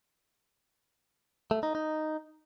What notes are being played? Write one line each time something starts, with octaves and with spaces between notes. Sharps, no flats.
A3
D#4
D#4